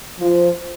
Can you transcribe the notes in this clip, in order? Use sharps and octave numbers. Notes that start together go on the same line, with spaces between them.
F3